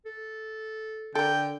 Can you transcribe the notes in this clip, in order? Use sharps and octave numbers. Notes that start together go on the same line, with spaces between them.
A4
D3 A4 A#4 G5